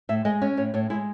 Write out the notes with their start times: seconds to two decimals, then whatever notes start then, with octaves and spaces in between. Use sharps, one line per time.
0.09 A2 E5
0.25 G#3 D#5
0.42 C#4 C#5
0.57 A2 C#5
0.74 A2 C#5
0.90 G#3 E4